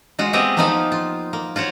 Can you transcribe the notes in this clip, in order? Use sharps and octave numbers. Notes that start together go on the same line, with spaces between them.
G#3 F4 F#4
G#3 B3 C4 G4 D#5 E5
F3 A#3 B3 D#4 F4 F5
F4
A#3
F4 F#4 C5 C#5